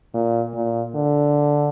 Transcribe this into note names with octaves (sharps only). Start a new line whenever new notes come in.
A#2
A#2
D3